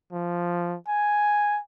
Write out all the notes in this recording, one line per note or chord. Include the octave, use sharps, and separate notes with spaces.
F3
G#5